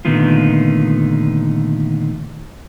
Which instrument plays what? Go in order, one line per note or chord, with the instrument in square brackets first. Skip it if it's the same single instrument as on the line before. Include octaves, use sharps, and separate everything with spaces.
[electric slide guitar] A#2 D3 D#3 A3 B3 F4